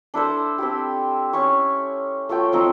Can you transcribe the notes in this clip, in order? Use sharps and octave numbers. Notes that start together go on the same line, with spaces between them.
D4 E4 A4 C5
C4 E4 G4
C#4 E4 C#6
A3 F4 C#5 G5
F3 C4 D#4